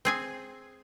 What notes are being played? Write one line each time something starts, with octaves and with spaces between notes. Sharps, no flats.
C4 G#4 G#5